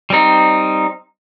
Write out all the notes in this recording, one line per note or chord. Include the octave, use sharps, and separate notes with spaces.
G3 C4 D#4